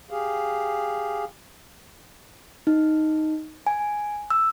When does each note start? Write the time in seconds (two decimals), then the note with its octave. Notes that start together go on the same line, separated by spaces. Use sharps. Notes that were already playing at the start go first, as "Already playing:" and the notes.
0.11 G4 G#4 F5
2.67 D#4
3.67 G#5
4.30 E6